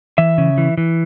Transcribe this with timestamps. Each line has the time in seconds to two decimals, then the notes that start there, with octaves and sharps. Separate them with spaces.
0.18 E3 E5
0.38 C#3
0.58 E3
0.78 E3